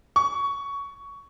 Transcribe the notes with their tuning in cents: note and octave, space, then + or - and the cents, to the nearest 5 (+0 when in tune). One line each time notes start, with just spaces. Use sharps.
C#6 +15